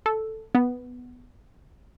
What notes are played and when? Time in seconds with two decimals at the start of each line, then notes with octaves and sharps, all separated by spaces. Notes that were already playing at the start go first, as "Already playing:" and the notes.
0.06 A4
0.55 B3